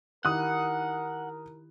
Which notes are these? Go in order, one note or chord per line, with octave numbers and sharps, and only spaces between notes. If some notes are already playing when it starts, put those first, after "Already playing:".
D#3 E4 G4 A#4 F#5 D#6 F#6